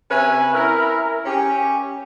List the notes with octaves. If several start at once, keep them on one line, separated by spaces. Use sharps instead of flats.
C3 C#4 B4 E5 G#5
E4 A#4
C#4 G4